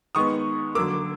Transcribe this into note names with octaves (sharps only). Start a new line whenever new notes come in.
D#3 G#3 B3 C#6 D#6
D3 F#3 A#3 D6 E6